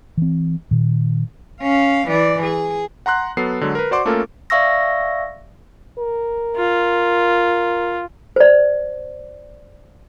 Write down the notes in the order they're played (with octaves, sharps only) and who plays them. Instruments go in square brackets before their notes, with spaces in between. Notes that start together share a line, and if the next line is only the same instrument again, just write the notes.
[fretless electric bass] E3 C4
A#2 D#3
[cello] C#4 F5
E3 D5
G#4
[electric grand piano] F#5 A#5 C6 F#6
F#3 B3 A4 C7
D3 F#3 G#3
A#4 B4
F#4 C5 D5 F#5 C6 D6
A3 A#3 C#4 F4 A4 A#4
[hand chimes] D5 E5 F5 C#6 E6 A#6
[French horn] A#4
[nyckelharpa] F4
[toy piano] C5 D5